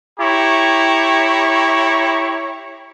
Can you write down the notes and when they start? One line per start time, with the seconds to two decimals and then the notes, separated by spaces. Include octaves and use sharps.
0.19 E4 G4 C#5 A#5 C#6